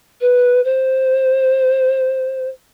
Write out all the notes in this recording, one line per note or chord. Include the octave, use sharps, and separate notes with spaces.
B4
C5